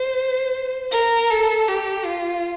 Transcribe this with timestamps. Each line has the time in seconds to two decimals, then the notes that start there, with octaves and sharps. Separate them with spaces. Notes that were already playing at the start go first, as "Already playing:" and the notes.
Already playing: C5
0.92 A#4
1.30 A4
1.68 G4
2.05 F4